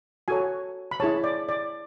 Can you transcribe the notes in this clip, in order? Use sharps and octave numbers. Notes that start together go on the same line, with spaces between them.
F#4 A4 C#5 G#5
B5
E4 G#4 C#5 A5
D5
D5